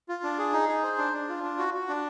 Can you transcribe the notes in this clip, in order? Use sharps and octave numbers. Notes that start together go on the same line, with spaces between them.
F4
D4
G#4
D#4
G#4
C5
D4
D4
F4
D4
F#4
F#4
D4